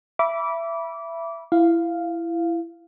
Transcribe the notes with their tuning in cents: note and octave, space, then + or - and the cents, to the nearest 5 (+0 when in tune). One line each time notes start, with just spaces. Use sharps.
E5 +20 B5 -20 D6 -20
E4 +20 F5 +0